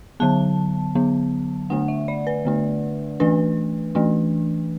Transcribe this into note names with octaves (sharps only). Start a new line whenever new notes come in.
D3 F#3 B3 A5
D3 F#3 B3
D3 A3 D4 F#5
E5
D5
B4
D3 A3 D4
E3 A3 D4 B4
E3 A3 D4